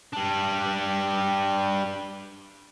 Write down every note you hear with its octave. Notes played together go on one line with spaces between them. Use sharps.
G3 D4